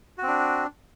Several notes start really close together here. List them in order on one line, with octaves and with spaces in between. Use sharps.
F#4 C4 D4